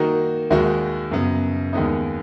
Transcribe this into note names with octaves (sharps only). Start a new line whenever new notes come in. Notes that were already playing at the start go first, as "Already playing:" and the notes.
Already playing: D#3 A#3 D#4 F#4
D#2 D#3 G#3 D#4 F#4
F#2 C#3 F#3 B3
D#2 D#3 G#3 B3 D#4